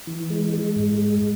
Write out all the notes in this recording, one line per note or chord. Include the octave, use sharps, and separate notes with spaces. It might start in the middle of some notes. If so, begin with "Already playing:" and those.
E3
G#3
G#3
G#2
G#3